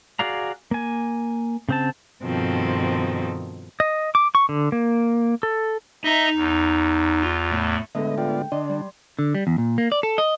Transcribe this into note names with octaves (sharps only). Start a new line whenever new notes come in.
F#4 G#4 D5 F5 A#5
A#3 G#5
C#3 C4 A5
G2 B2 D#3 F3 C4 A4
D#5
D6
C#6
D3
A#3
A4
D#4 D#5 E5 A#5
E2
F4
A2
A2 D3 G#3 B3 A4 D#5 E5
B3 F4 D5 G5
D3 D4 D5 D#5 C6
G3
D3
G3
E2
A#2
A#3
D5
A4
D#5